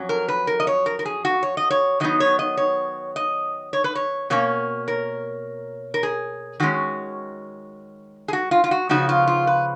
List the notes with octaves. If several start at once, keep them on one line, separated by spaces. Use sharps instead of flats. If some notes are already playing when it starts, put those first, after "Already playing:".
Already playing: F2 F#3 C#4
A#4
B4
A#4
D#5
C#5
A#4
A#4
G#4
F#4
C#5
D#5
C#5
D#3 F#3 B3 D#4 D#5
C#5
D#5
C#5
D#5
C#5
B4
C#5
B2 A#3 C#4 C#5
A#4
A#4
G#4
D#3 G#3 C#4 F#4
G#4
F#4
F4
F4
F#4
C#3 F3 B3 D#4 F#4
F4
F4
B4